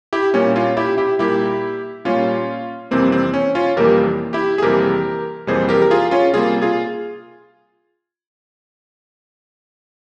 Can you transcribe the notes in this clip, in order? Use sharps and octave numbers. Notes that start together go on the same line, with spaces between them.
E4 G4
A#2 G3 A#3 C#4
C#4 F4
E4 G4
E4 G4
A#2 G3 A#3 E4 G4
A#2 G3 A#3 C#4 F4
F2 C3 E3 G3 A#3 C4
C4
C#4
C#4 F4
F2 C3 E3 G3 A#3 G4 A#4
E4 G4
G#4
F2 C3 E3 G3 A#3 G4 A#4
F2 C3 E3 G3 A#3 G#4 C5
G4 A#4
A#4
F4 G#4
C#4 F4
C3 G3 A#3 F4 G#4
F4 G#4